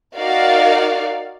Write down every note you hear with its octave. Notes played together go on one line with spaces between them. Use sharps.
D#4 F#4 A#4 D5 F5